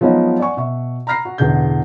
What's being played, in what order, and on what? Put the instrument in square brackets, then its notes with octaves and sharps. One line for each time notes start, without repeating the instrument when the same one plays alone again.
[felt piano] F3 F#3 G#3 B3 C#4 D#4
D5 F#5 G#5 C#6
B2 E5 C#6
A#5 B5 F6 A#6 C7
F#4
A1 E2 B2 D3 G#4 G6